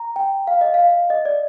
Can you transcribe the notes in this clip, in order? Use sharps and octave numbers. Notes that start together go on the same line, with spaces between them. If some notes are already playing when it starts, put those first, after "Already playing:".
Already playing: A#5
G5
F5
D#5
F5
D#5
D5